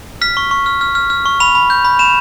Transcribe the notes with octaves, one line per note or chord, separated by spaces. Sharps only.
F6 B6
C#6
C#6
F6
F6
F6
F6
C#6
B5 F7
B5
G6
B5
B5 E7